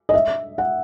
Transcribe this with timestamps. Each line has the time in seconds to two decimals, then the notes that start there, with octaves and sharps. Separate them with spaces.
0.09 D#5
0.14 E5
0.58 F#5